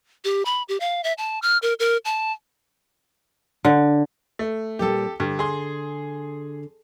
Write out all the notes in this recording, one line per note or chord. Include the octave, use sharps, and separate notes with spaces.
G4
B5
G4
F5
E5
A5
F6
A#4
A#4
A5
D3
A3
A#2 G3 C4 G4 A4
G2 D3
G#4 C6